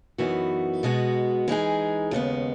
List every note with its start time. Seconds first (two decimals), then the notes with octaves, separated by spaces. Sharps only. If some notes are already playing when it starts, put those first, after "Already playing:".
0.18 F#2 E3 B3 D#4 F#4
0.83 B2 G#3 B3 F#4
1.48 E3 G#3 D#4 G#4
2.11 D#2 C#3 G#3 B3